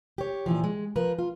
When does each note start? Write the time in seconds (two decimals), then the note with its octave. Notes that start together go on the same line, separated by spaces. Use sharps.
0.18 G4 C#5
0.46 A#2 E3 F3
0.64 G#3
0.96 F3 A#4 B4
1.19 F4